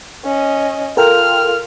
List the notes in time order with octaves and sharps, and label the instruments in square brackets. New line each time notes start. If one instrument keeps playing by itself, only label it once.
[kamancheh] C#4 D#5
[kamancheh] F4 F6 [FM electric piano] A4 A#4 G5